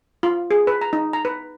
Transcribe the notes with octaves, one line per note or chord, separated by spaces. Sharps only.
F4
G#4
B4
A#5
D#4
A#5
B4